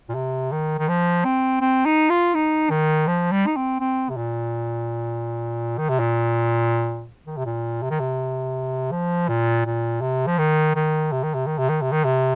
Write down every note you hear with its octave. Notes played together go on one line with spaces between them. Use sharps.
A#2
C3
D#3
D#3
F3
C4
C4
D#4
F4
D#4
D#3
F3
G3
D#4
C4
C4
C3
A#2
D#3
C3
A#2
D#3
C3
A#2
C3
D#3
C3
F3
A#2
A#2
C3
F3
D#3
D#3
C3
D#3
C3
D#3
C3
D#3
C3
D#3
C3